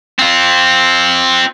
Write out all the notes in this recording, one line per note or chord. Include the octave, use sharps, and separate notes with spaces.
C4 F4